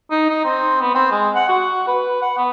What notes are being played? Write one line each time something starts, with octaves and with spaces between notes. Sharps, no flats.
D#4
D#4
C4
B3
C4
G#3
F#5
F#4
B4
F#5
B3